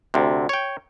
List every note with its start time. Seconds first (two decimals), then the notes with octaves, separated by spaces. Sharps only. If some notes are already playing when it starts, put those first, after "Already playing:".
0.14 D2 C3
0.49 C#5 G5